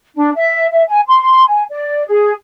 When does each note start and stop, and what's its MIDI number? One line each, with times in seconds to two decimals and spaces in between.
0.15 0.30 62
0.35 0.67 76
0.71 0.82 76
0.88 1.00 80
1.07 1.44 84
1.47 1.63 80
1.70 2.02 74
2.07 2.32 68